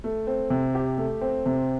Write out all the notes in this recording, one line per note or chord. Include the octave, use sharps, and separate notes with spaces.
A3
C4
C3
G4
A3
C4
C3